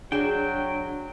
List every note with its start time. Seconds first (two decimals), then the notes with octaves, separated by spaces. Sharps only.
0.12 F#3 D4 G#4 G5 E7